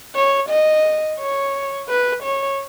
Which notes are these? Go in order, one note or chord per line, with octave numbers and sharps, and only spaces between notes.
C#5
D#5
C#5
B4
C#5